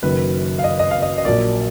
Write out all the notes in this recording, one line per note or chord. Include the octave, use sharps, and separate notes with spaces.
F#1 F#2 D#3 F#3 B4
F5
D#5
D#5
F5
D#5
D#5
A#1 A#2 F#3 A#3 D5